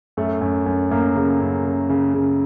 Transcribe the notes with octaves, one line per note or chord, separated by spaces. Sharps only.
F#2 A3
F#2
F#2
F#2 A#3
C#3
F#2
C#3
C#3
C#3